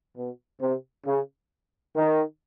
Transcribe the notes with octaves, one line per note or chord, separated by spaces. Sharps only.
B2
C3
C#3
D#3